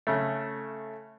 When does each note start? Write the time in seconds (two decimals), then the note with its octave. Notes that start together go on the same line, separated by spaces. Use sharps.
0.07 C#3 A3